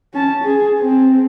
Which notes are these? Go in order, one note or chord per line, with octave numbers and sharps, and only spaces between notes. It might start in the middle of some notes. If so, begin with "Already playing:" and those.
C#4 A5
G#4
C4